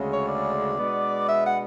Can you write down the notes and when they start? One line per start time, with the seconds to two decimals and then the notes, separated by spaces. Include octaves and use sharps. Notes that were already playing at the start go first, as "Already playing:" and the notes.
Already playing: D2 C#3 G#3 C#4
0.11 C#5
0.27 D5
0.77 B2 G#3 B3 D4
1.27 E5
1.44 F#5